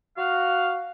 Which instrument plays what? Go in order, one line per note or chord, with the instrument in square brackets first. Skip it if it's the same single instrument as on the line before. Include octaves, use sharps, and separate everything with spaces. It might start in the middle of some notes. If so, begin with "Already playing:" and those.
[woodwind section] F#4 F5